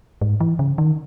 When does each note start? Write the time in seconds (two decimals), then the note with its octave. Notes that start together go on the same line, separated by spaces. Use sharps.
0.22 G#2
0.40 E3
0.59 C#3
0.78 D#3